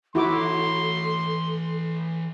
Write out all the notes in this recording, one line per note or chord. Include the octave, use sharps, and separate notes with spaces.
E3 E4 F#4 A4 C#5 C6 D6